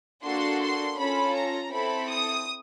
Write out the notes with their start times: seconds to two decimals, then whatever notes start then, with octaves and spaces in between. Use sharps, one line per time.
0.23 A#3 D4 F#4 A4 C6
0.61 C6
0.98 C#4 F4 A4 B5
1.35 A#5
1.72 C4 E4 A4 B5
2.09 D#6